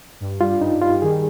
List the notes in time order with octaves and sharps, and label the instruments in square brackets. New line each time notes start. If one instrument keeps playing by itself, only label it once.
[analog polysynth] G2
[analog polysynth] G3 [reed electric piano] F4
[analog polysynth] G2 [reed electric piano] D#4
[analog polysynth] G3 [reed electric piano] F4
[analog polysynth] D#3 [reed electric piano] G#4